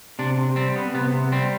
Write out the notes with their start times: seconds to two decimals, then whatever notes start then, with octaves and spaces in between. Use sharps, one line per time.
0.19 C3 D4
0.37 C3
0.56 G3 C4
0.76 B3
0.94 C3 B3
1.14 C3
1.32 G3 C4